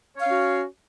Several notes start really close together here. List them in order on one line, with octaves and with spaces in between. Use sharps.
C#5 F5 C#4 F#4